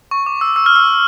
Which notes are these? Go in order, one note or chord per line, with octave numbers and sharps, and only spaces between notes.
C#6
D6
E6
E6
F6
E6